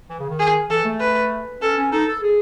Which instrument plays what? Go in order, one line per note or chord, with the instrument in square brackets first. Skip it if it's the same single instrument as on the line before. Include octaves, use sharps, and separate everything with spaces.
[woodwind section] E3
C#3
D#3
[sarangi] G#4
[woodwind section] E3 [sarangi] A4
[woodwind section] A3
[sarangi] B4
[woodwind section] C#4 [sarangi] A4
[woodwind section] C#4
[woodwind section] D#4 [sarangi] A4
[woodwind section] A4
G#4